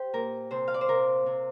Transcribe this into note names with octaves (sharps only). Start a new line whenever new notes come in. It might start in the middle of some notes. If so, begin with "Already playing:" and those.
Already playing: G4 C5
A#2 A#4
C3 C5
F5
D5
C5
C3 A#4
C3